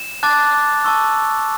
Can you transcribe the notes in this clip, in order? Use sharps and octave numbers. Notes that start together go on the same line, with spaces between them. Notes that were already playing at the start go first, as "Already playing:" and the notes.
Already playing: E7
A5 D6 F#6 A6
A5 C#6 E6